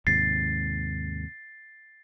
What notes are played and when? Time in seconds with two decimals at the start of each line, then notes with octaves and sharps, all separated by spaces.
0.07 D#2 G#2 C3 A6 C7